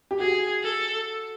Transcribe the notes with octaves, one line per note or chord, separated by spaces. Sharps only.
G4
F#4 G#4
A4